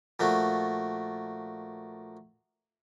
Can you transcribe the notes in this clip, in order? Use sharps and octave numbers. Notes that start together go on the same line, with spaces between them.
A#2 F3 A3 F#4